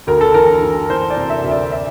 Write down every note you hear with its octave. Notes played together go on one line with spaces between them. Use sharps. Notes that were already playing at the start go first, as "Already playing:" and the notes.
D2 A#4
A4
E3 A#4
E3
E3 C5
D5
C3
E5
D2
D5
E5